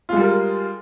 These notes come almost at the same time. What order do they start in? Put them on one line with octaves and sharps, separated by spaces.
F4 G#3 G3 A#4